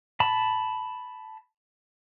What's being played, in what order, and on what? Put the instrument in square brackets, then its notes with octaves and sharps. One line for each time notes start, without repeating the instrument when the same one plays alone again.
[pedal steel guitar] A5 B5